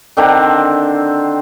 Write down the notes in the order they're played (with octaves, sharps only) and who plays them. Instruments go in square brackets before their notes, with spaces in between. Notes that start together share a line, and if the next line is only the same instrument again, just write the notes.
[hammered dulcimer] D3 D#3 C4 D4